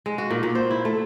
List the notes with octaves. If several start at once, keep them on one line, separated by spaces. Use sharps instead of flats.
G#3
F#4
A#2
A#2
C5
E4
A3